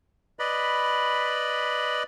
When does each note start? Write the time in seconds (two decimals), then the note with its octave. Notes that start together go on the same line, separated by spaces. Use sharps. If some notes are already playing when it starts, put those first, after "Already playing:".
0.39 B4 D5 D#5 B5